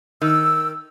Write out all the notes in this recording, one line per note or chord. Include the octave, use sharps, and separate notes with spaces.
D#3 E6